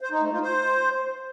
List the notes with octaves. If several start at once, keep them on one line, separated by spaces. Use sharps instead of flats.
C5
D#4
A3
F4
C5